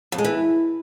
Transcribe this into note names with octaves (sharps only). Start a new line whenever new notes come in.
F2
G#3
E3